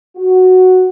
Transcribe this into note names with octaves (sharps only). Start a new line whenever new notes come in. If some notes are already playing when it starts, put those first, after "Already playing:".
F#4